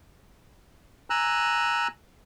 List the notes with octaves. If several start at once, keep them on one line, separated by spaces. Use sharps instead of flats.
G#5 A#5 E6 F#6